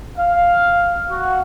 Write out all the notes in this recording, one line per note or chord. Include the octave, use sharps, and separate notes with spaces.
F5
F#4